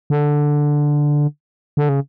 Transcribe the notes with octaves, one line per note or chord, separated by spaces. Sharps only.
D3
D3
C#3